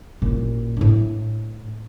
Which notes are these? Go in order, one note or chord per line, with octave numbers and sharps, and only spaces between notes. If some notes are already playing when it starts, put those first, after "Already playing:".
A1 A#2
A2 D4